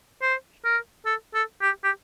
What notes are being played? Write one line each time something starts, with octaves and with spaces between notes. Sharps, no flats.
C5
A#4
A4
A4
G4
G4